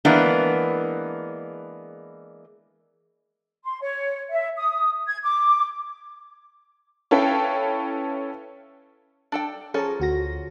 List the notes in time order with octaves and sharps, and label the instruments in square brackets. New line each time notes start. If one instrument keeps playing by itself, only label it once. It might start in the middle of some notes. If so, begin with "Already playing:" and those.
[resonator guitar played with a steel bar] E3 G#3 A#3 B3 D4
[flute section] C6
C#5
E5
D#6
G#6
D6
[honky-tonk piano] C#4 E4 A4 B4 F5 G5
[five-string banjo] D4 A4 G5
[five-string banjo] F3 C#4 A4 [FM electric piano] G#4 A#5
[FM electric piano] D2 F#4 A#6